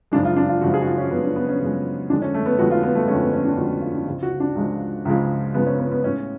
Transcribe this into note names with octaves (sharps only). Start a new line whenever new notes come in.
F#2 C#3 F3 G#3 D4
F4
D4
F4
F#2 C#3 F3 G#3 F#4
G#4
F#4
F4
C#4
F#2 C#3 F3 G#3 B3
D4
B3
C#4
F#2 C#3 F3 G#3
F2 D3 G#3 D4
C#4
A3
B3
F2 D3 G#3 F#4
F4
B3
A3
F2 D3 G#3 C#4
B3
C#4
D4
F2 D3 G#3 F#4
F#4
F4
D4
C#2 C#3 F3 G#3 F4
F#4
D4
C#2 C#3 F3 G#3
C#2 C#3 F3 G#3
C#2 C#3 F3 G#3 B3
C#4
B3
B3
A2 G#3 C#4